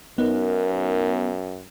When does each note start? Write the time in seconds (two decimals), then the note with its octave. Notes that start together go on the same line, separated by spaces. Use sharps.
0.18 F#2 B3 D#4 A#4